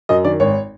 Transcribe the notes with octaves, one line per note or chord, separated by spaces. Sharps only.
F#2 D#5
D#3 D5
G#1 C#5